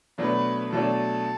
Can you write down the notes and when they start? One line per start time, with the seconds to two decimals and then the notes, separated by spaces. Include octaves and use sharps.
0.18 B2 F#3 A3 D4 B4
0.72 B2 F#3 A3 D4 A4